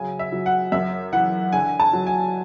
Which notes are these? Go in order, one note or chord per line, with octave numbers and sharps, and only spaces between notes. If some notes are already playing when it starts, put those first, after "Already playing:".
Already playing: C#3 F#3 G#5
E5
F#3
F#5
F#2 E5
E3 F#5
D3 G#5
A5
F#3
G#5